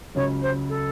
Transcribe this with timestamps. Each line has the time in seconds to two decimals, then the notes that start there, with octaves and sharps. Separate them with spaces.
0.15 C#2 C#3 F#3 C#5
0.42 C5
0.69 A4